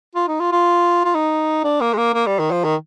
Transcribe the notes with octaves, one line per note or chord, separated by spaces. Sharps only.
F4
D#4
F4
F4
F4
D#4
D4
A#3
G#3
A#3
A#3
G3
D#3
F3
D#3